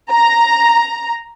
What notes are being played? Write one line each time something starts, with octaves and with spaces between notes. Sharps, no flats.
A#5